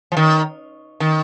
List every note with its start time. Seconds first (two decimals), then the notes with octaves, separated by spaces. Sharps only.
0.12 F3
0.17 D#3
1.00 D#3